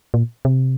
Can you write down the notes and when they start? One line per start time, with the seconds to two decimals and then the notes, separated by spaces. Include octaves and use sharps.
0.14 A#2
0.45 C3